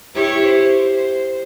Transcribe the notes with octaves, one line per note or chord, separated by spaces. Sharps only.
E4 G4 C#5
C5